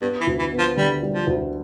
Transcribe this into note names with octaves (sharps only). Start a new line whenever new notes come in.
G2 B3
E3
D2
E3
B3
F3
D3 G3
G3
F3
D2